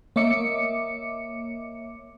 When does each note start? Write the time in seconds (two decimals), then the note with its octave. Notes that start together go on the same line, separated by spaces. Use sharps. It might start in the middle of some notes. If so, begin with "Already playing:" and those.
0.16 A#3 C#5 D#5 E5 D6 C#7